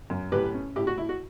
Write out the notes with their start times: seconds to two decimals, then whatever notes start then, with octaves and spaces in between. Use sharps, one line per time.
0.10 F#2
0.32 A2 G4 B4
0.54 C#4
0.76 A2 E4 G4
0.87 F#4
0.98 E4
1.09 F#4